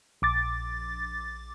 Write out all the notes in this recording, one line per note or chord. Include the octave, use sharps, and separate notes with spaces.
A#1 D6 A6